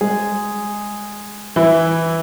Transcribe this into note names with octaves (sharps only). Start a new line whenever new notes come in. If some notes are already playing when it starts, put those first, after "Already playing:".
G#3 G#4
E3 E4